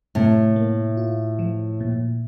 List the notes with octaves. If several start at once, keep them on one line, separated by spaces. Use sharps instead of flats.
A2 C3
A#3
F4
F3
A#2